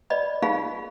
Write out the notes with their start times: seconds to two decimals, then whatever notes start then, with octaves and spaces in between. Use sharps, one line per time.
0.10 D5 D#5 B5
0.42 D#4 F4 G#4 F5 B5